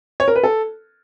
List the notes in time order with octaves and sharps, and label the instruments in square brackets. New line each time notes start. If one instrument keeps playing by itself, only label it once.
[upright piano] C#5
A#4
B4
A4